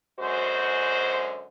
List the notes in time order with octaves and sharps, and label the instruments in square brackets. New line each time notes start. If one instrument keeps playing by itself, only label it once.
[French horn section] F#2 D3 G#3 F#4 C5